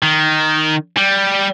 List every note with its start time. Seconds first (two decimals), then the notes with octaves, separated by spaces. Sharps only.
0.03 D#3
0.97 G3